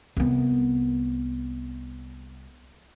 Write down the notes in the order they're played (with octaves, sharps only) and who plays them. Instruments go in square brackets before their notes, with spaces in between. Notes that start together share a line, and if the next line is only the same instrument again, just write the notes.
[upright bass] C2 B3